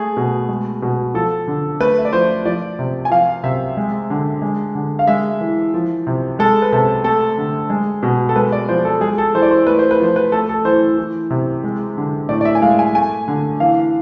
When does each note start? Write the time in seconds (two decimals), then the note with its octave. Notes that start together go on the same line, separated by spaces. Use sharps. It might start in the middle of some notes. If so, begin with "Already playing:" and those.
Already playing: A3 G#4
0.17 B2
0.49 G#3
0.82 B2
1.14 F3 A4
1.47 D3
1.80 A3 B4
1.98 E5
2.05 D5
2.13 F3 C5
2.45 F3 D5
2.79 C3
3.05 G#5
3.11 F3 F5
3.44 C3 E5
3.77 G#3
4.10 D3
4.42 G#3
4.75 D3
4.99 F5
5.07 G#3 E5
5.41 E3
5.74 F3
6.07 C3
6.39 G#3 A4
6.62 B4
6.72 C3 A4
7.04 A3 A4
7.38 D3
7.70 G#3
8.03 B2
8.29 A4
8.36 G#3 B4
8.52 D5
8.69 F3 C5
8.85 A4
9.01 G#3 G#4
9.18 A4
9.34 E3 C5
9.42 D5
9.51 C5
9.67 A3 B4
9.79 C5
9.91 B4
10.00 F3 C5
10.16 B4
10.32 A3 A4
10.49 A4
10.65 E3 C5
10.98 E3
11.30 C3
11.64 G#3
11.97 D3
12.29 A2 D5
12.41 D5
12.45 E5
12.55 G#5
12.62 G#3 F5
12.79 G#5
12.95 A3 G#5
13.28 D3
13.60 E3 F5